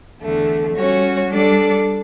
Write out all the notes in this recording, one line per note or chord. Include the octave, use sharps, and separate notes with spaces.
E2 D3 A3
G3 C#4 F#4 C#5
G3 D4 A4 D5